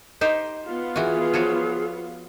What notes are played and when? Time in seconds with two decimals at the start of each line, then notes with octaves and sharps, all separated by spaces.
0.21 D#4 G4 C5
0.65 B3 F4
0.96 E3 F#4 G#4
1.34 F3 F#4 C#5